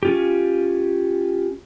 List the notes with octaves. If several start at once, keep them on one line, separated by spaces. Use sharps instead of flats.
C#4 F4 G4